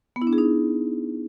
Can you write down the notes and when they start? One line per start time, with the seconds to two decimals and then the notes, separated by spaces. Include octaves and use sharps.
0.16 B3
0.22 E4
0.27 D4
0.33 G#4
0.38 D#4